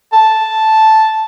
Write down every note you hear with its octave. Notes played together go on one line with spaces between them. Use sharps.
A5